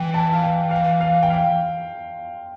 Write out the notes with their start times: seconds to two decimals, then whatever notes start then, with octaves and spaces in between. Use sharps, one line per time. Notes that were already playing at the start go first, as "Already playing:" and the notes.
Already playing: E3 G5
0.14 A5
0.33 F5
0.43 G5
0.71 F5
1.01 F5
1.23 G5
1.30 F5